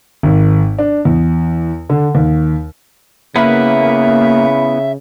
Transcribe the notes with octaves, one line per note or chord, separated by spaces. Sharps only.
G#1
D4
E2
D3
D#2
C#3 A#3 B3 E4 B4 E5